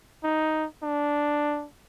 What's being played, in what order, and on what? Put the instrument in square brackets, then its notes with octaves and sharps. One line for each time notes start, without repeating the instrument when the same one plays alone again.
[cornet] D#4
D4